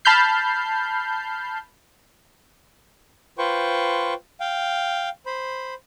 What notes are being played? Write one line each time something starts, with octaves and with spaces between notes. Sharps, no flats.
A5 B5 F6 G6 C7
F4 B4 C5 G5 C#6
F5 G5
C5 B5